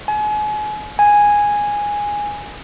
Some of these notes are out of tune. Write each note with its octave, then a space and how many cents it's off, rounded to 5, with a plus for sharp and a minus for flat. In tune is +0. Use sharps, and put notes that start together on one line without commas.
G#5 +35
G#5 -5